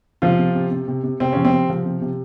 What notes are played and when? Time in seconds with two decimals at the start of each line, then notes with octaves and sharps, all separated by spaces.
0.22 C3 F3 F4
0.39 C3
0.55 C3
0.71 C3
0.88 C3
1.04 C3
1.20 C3 C4
1.33 F3 C#4
1.45 C4
1.53 C3
1.70 F3
1.85 C3
2.01 C3